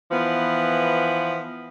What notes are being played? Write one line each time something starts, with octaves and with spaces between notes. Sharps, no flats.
E3 F3 B3